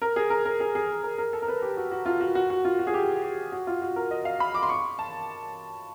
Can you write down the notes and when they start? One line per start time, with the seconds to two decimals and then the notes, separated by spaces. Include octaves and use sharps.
0.02 A#4
0.16 G#4
0.30 A#4
0.45 A#4
0.60 G#4
0.75 G#4
1.04 A#4
1.18 A#4
1.33 A4
1.42 A#4
1.48 B4
1.62 G4
1.77 F#4
1.92 F#4
2.06 F4
2.21 F#4
2.35 F#4
2.50 F#4
2.65 F4
2.79 F#4
2.87 G#4
2.94 G4
3.23 G4
3.52 F#4
3.67 F4
3.82 F#4
3.96 A#4
4.11 D#5
4.25 F5
4.40 B5
4.55 D6
4.63 C6
4.69 C#6
4.99 A5